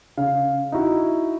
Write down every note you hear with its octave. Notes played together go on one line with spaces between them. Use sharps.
C#3 F5
D#4 E4 F#4